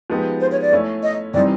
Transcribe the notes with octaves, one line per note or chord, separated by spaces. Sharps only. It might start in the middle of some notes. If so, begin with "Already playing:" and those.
F3 G#3 B3 D#4 G4
C5
C#5
D5
A3 C#4 E4
D#5
C3 E3 G3 C4 D#4 D5